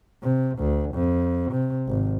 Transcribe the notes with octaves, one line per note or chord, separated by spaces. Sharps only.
C3
D2
F2
C3
G#1